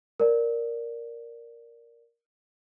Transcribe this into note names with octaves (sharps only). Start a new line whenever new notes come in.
A#4 D5